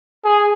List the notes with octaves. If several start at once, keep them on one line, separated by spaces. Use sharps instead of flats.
G#4